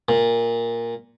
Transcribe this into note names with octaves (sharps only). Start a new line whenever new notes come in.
A#2